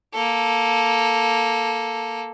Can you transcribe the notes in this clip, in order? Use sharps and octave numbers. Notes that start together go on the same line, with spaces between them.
A#3 A4